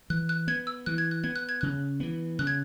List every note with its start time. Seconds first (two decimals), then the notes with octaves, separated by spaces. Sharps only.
0.10 E3 F#6
0.29 F#6
0.48 B3 G#6
0.67 E6
0.86 E3 F#6
0.98 G#6
1.11 F#6
1.24 B3 G#6
1.36 F#6
1.49 G#6
1.61 C#3 F#6
2.00 E3 B3
2.39 C#3 F#6
2.47 G#6